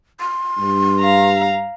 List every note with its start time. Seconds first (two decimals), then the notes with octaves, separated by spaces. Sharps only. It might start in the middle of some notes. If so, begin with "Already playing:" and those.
0.20 C6
0.59 G2
1.00 F5 A#5